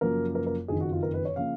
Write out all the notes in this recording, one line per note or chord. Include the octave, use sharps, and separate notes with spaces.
F#1 F#2 F3 A#3 A#4
A#4
A#4
F#1 F2 D#3 G#4
F#4
F4
A#4
B4
C#5
C#3 F3 A#3 F5